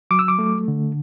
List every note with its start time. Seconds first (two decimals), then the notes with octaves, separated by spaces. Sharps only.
0.11 F#3 D6
0.19 E6
0.28 D6
0.39 A3
0.68 D3